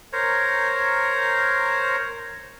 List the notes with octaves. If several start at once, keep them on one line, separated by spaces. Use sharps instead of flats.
A#4 C5 C#5 A#5